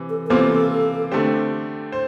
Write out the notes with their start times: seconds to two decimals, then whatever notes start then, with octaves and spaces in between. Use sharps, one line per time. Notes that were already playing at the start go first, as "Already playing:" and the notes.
Already playing: C3 E3
0.10 A4
0.26 A#4
0.30 C3 E3 A#3 F4 A4 C5
1.12 D3 A3 C4 G4 C5
1.92 C5